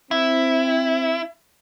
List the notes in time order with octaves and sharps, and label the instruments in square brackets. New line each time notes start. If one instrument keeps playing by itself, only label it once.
[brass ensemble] C4 [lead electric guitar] E4